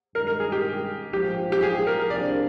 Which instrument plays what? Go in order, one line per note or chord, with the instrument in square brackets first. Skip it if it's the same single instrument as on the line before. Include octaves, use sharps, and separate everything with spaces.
[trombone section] G2 D#3 G#3 D#4 [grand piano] A#4
[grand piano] A#4
G#4
G4
[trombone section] A#1 G#2 F3 [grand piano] G4
[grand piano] G4
G#4
A#4
[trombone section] C2 C3 F3 A#3 D4 [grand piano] D5